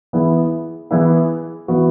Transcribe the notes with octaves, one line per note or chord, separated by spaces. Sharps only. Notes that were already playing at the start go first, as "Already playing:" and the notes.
E3 B3 E4 G#4
E3 B3 E4 G#4
E3 B3 F#4